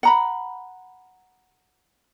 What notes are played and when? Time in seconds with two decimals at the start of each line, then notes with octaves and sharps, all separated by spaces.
0.03 F#5 A#5 B5